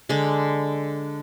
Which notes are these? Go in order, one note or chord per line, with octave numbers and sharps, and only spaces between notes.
D3 G#3